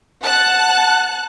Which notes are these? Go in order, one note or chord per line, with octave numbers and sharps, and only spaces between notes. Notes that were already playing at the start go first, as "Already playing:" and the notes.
F#5 A5 F#6